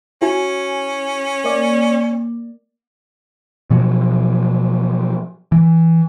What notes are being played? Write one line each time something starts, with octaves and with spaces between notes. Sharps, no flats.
C#4 E4 F#4 G#5
A#3 D5
B2 F3 F#3
E3